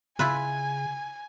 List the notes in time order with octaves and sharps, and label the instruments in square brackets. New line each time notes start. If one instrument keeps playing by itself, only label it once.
[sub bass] C#3 [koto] E4 F4 B4 [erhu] G#5